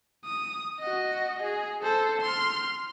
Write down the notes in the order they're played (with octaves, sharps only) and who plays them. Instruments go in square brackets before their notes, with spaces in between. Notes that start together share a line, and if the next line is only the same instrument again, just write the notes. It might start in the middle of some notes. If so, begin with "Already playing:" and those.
[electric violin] D#6
F#4 D#5
G#4
A4 C5
C6 F6